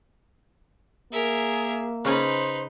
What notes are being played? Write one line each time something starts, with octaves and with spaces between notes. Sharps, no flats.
A#3 G#4 A#4 E5
C#3 C#4 D#4 B4 C5 G#5